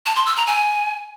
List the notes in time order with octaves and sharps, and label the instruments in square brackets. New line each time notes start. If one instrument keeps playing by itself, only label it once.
[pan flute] A5
C6
E6
A#5
G#5